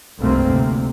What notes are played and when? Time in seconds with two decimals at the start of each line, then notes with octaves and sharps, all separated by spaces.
0.19 F1 C2 G2 A3 A#3 C4
0.49 D2 C3